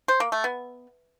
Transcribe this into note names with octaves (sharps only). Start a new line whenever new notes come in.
C5
A#3
A3
B3